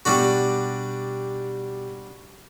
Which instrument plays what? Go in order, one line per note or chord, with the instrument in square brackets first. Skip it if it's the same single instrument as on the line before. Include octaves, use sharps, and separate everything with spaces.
[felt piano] B2 G4 [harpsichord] G3 D4 F#4